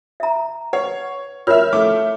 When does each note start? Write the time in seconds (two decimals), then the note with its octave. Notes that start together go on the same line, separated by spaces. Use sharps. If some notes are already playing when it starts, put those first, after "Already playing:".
0.20 E5 A#5
0.73 B4 C#5 F#5
1.47 F4 A#4 C#5 E5 F6
1.73 A3 E4 D6